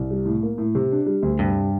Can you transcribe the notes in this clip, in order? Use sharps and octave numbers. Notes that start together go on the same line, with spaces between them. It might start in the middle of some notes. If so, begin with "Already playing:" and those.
Already playing: C2
G3
A2
A#3
A2
C3
D4
G3
D2
G2 C3